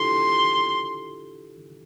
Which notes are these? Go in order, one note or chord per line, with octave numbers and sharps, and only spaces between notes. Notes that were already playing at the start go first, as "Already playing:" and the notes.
Already playing: D4 E4 F4 G4 A4 C6